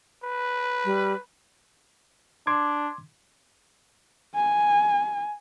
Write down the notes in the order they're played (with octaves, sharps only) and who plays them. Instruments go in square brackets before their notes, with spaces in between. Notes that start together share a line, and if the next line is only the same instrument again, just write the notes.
[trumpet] B4
[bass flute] G3
[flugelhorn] D4 [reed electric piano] C6 D6 G#6
[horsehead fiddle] G#5